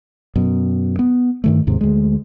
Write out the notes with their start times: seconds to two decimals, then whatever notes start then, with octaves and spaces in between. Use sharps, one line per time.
0.36 F#2 B2
0.99 B3
1.44 G2 D#3 A3
1.67 D#2 G#2 C3
1.81 D2 G#3